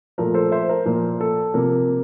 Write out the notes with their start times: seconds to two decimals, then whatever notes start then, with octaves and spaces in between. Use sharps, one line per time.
0.18 A#2 F3 A3 A#4
0.34 A4 C5
0.51 C5 E5
0.69 A#4
0.86 A#2 F3 A#3 A#4
1.21 A4
1.54 C3 F3 A#3 A#4